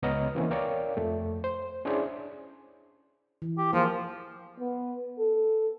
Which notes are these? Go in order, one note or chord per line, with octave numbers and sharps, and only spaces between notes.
C#2 B3 C#5 D#5 A#5 F6
E3 A#3 C4 C#4
A#4 C#5 D5 F5 G5
F2 A3
C5
C#4 D4 E4 G#4 C5 D5
E3
G4
F3 A#3 F4 G#4
B3
A4